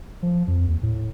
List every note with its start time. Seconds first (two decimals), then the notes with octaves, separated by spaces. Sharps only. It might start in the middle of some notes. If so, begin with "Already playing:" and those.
0.23 F3
0.48 F2
0.68 D#2
0.83 A2